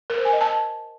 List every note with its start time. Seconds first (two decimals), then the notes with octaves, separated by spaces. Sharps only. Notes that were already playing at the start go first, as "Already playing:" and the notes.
0.10 A#4
0.17 C5
0.25 G#5
0.33 D#5
0.41 A5